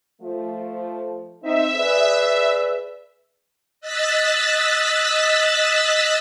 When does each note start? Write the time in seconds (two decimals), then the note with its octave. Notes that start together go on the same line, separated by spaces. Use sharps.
0.22 F3 A3
1.43 C4 D#4 E5
1.76 G#4 B4 D5
3.81 D#5 E6 F#6 A6 B6